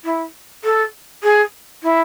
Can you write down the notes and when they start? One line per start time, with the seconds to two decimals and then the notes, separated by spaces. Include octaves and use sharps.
0.05 E4
0.64 A4
1.23 G#4
1.83 E4